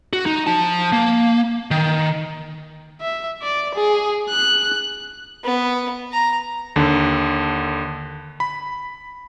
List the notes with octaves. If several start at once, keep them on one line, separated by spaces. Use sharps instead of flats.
F#4
D#4
F3 A5
A#3
D#3
E5
D5
G#4
F#6
B3
A#5
D#2 D3
B5